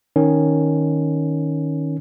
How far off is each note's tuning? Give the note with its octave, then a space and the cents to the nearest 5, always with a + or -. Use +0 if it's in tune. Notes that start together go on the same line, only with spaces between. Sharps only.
D#3 +0 C#4 +0